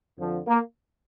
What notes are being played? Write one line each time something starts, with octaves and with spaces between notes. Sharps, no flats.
F2 D3 F3
A#3